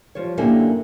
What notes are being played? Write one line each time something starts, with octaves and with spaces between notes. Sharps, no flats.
F3 G3 C#5
F#2 D3 A#3 E4 G4 G#5